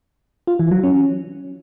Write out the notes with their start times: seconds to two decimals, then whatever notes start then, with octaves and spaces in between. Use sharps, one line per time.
0.47 F4
0.59 E3
0.71 F#3
0.83 C#4